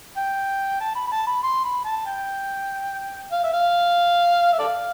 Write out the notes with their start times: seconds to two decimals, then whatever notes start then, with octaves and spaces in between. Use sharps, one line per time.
0.17 G5
0.80 A5
0.95 B5
1.07 B5
1.12 A5
1.27 B5
1.43 C6
1.64 B5
1.85 A5
2.06 G5
3.32 F5
3.44 E5
3.53 F5
4.53 E5
4.59 A4 D5 F5